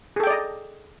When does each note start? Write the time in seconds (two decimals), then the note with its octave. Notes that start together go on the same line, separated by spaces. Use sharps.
0.16 G#4
0.20 A4
0.23 G5
0.27 D5
0.31 D#5